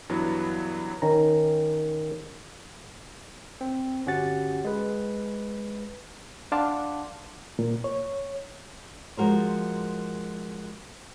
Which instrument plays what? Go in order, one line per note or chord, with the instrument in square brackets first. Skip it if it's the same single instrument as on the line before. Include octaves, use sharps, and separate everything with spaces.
[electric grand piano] G2 E3 F#3 B3 E4
[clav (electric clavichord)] D#3 C#4 A#5
[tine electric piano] C4
G1 C#4 F#4 G4 F#5 A6
G#3 B4
[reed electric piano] D4 F5 F#5 A5 C6 D6
A#2
C#5
[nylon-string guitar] F3 G#3 F#4 A#4 C5